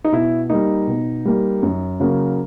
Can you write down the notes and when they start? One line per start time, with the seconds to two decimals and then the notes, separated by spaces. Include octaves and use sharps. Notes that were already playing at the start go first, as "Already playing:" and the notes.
0.04 D#4
0.12 B2 E4
0.50 G3 A#3 D#4
0.87 B2
1.25 G3 A#3
1.63 F#2
2.00 C#3 F#3 A#3